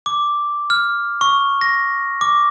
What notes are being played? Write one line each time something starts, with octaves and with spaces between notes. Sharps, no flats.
D6
F6
C#6
A#6
D6